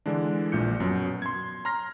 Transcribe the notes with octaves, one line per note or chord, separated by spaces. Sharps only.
D3 E3 G#3 D4
A#1 A#2 G6 C#7
F#2 B2 F#3
C6 G#6
A#5 C6 F6 A#6